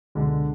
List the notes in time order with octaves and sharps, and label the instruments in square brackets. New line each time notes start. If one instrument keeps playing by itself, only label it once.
[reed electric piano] C#2 B2 G#3 [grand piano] D3